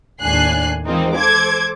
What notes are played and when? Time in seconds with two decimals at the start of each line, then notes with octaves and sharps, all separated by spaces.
0.23 D#2 A2 D4 G#5 F#6 C7
0.85 E3 G#3 A#3 C4 D#4 F4
1.16 A4 C5 D6 G#6